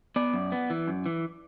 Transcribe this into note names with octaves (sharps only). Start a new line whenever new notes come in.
B3 D5
F#2
B3
E3
F#2
E3